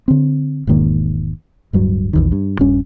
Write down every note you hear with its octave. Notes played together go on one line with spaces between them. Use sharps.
D3 C4
E1 G#2 D#3 A#3
D1 G2 F#3
A#1 E2 D#3
G2
D#1 G2 C#4